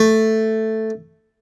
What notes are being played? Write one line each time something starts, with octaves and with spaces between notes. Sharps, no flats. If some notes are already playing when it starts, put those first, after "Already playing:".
Already playing: A3